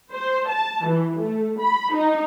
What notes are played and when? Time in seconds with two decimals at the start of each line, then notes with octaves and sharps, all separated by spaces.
0.11 C5
0.48 A5
0.84 E3
1.19 A3
1.59 B5
1.94 D#4